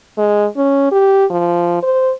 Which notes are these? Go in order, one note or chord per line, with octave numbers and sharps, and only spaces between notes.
G#3
C#4
G4
F3
C5